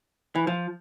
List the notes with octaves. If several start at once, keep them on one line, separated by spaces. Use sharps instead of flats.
E3
F3